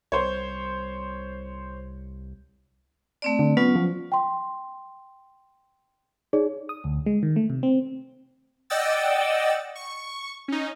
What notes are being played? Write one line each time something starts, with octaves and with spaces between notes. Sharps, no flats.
C2 C5 C#5
A3 C4 D5
D3
F#3 B3 C#4 F4
F3
G5 C6
D#4 G#4 C#5 D5
D#6
D2
G#3
D#3
A3
C3
C4
D5 D#5 F#5 G5 E6 A6
C#6
C#4 D#4